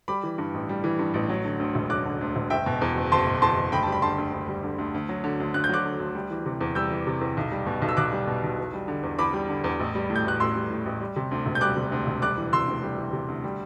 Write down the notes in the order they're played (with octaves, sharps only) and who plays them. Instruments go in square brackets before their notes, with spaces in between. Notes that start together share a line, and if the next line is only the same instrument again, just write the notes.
[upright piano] G3 B5 D6
E3
G2
A1
G3
E3
G2
A1
F#3
D3
D2
E1
F#3 D6 F#6
D3
D2
E1
F#1 E5 G5
B2
E2
F#1
F#1 A5 C6
B2
E2 A5 C6
F#1
D2 G5 B5
G3 A5
B5
D3 A5 C6
D2
D2
G3
D3
D2
D2
F#3
D3
D2
D2 F#6
G6
F#3 D6 F#6
D3
D2
G3
E3
C3
E2
G3 E6 G6
E3
C3
E2
B1
G3
B2
B1
E6
B1 D6 F#6
G3
B2
B1
E2
G3
D3
E2
E2 B5 D6
G3
D3
E2
A1
G3
A2
G6
A1 F#6
A1 C6 E6
G3
A2
A1
G3
C3
D2
E1
G6
G3 D6 F#6
C3
D2
E1
G3 D6 F#6
E3
C3 C6 E6
D2
G3
E3
C3
D2
G3